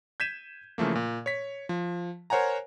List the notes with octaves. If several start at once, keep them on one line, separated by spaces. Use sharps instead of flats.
G6 G#6 B6 D#7 E7
C#3 E3 F3 A3 A#3
A#2
C#5 B6
F3
A#4 C5 C#5 F#5 G#5 A#5